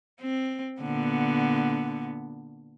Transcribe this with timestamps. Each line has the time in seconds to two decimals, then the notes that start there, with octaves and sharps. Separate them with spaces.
0.21 C4
0.81 A#2 D3 B3